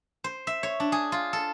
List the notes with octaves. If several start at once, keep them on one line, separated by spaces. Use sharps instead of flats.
C5
E5
C#5
D4
G#4
F4
A4